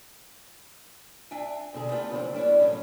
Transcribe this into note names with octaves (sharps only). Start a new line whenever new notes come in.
D4 E5 G5 G#5
D2 B2 D3 G#4
A3 B3 D4 F4 G4 B4
C#3 E3 F3 A#3 C4 D4
G3 A#3 D4 E4 C#5
D2 A2 D#3 F#3 B3 C#4